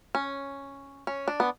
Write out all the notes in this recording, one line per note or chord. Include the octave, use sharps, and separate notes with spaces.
C#4
C#4
D4
B3